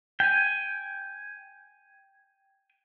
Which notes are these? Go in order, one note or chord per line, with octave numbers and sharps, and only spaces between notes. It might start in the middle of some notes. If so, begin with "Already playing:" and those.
G5 G#5